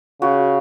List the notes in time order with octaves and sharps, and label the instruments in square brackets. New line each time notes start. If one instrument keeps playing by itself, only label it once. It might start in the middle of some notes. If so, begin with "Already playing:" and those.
[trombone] C#3 [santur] F#4